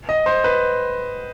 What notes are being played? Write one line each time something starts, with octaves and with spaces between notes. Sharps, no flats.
D#5
C5
B4